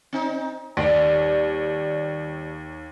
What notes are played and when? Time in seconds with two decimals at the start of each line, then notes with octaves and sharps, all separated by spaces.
0.13 C4 D#4
0.77 D#2 G3 D5